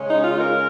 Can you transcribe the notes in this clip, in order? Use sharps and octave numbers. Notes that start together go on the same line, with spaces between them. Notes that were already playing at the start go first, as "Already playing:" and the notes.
Already playing: C#3 G#3 C#4
D#4
F4
A#4